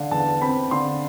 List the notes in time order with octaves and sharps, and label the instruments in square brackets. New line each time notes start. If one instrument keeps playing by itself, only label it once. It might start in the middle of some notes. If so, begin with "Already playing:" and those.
Already playing: [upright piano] D3 [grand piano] F5
[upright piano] E2 [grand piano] A5
[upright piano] C4 [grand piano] B5
[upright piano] D3 [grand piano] C6